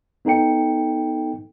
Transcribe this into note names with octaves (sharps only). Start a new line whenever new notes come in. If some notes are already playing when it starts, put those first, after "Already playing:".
B3 D#4 A4 G5 C#7